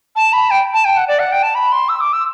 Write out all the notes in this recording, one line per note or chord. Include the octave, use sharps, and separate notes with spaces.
A5
B5
G5
A5
G5
F#5
D5
F#5
G5
A5
B5
C6
E6
D6
E6